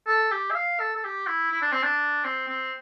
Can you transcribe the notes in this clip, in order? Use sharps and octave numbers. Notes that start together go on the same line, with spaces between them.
A4
G4
E5
F5
A4
A4
G4
E4
E4
D4
C4
D4
C4
C4